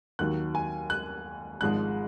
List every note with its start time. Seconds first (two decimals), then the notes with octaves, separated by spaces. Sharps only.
0.19 D#2 D#3 F#3 F#6
0.55 G#5
0.90 F#6
1.61 G#1 G#2 F3 G#3 F#6